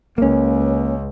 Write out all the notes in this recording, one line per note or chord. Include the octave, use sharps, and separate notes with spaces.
C#2 A#3 C#4